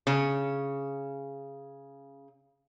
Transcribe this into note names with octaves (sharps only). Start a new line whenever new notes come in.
C#3 C#5